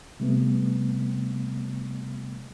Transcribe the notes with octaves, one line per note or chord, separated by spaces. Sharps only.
C3 G3 A3 B3